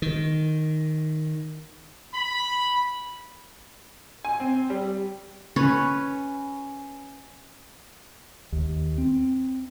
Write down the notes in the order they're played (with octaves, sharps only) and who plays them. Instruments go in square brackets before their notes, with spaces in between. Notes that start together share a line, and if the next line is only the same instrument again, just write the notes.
[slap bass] D#3
[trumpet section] B5
[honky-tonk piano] G#5
C4
G3
[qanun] C#4 B4 C#5
[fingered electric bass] D#2
C4